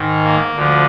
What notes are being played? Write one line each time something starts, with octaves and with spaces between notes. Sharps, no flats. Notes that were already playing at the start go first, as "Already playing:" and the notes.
Already playing: G#2 D#3
A#3
D2 D3 F3